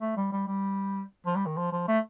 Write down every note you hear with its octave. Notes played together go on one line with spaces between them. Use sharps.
A3
G3
G3
G3
F3
G3
D#3
F3
F3
A3